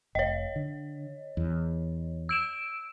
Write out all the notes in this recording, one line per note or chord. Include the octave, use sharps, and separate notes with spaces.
F1 C#5 D#5
D3
E2
E6 D7 E7